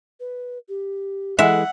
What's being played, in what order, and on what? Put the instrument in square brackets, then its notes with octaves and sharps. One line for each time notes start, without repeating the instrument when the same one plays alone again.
[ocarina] B4
G4
[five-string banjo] E3 G#3 [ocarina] A4 [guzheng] E5 [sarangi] F#5